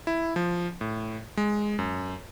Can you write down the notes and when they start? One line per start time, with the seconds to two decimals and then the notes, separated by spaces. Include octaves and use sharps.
0.07 E4
0.36 F3
0.81 A2
1.37 G#3
1.79 F#2